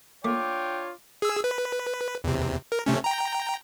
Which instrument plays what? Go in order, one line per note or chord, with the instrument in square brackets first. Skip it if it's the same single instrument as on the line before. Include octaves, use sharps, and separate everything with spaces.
[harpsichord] A3 A#3 [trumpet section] D4 F4 C#5 [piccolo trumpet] G5 [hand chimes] D6
[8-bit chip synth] G#4 E6
B4
E2 C3
A#4
C3 A3 C#4
G5 A#5